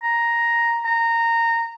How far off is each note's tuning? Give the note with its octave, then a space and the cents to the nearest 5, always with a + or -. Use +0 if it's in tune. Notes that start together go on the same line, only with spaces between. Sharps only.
A#5 +5
A#5 -15